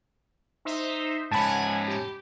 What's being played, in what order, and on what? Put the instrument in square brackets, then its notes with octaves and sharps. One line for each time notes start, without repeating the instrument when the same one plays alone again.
[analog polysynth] D#4 C5 E5
[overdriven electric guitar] G#2 C#4 [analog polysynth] F#5 G#5 [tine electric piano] A5 B5
[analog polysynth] G4